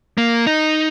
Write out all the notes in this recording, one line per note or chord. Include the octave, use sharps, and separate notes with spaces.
A#3
D#4